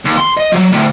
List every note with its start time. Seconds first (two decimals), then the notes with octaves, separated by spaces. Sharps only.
0.05 D#2
0.17 C6
0.37 D#5
0.52 F3 F#3
0.72 D2 A2